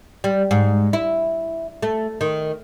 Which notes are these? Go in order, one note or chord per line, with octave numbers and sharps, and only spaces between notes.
G3
G#2
E4
A3
D#3